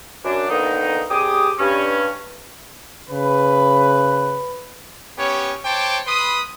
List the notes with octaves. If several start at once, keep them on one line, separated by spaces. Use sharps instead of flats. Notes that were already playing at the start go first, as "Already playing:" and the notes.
F#2 D4
D3 D#3 A#3 B3 D#4
C2 G4 G#4 D6 D#6
G2 C#4
C#3 B4
B3 C#4 G4 C#5
C5 C#5 G5 A5 D6
B4 B5 C6 D#6